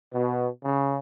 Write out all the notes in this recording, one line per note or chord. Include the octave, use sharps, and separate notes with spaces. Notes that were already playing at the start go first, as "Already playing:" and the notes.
B2
C#3